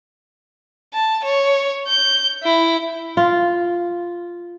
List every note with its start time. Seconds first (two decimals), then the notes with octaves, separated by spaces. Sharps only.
0.94 A5
1.25 C#5
1.88 G6
2.44 E4
3.17 F4